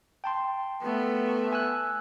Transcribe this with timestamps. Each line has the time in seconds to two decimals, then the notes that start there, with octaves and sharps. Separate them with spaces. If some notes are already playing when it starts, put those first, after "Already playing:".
0.24 G5 A5 C6
0.82 A3 B3
1.53 G#5 E6 F#6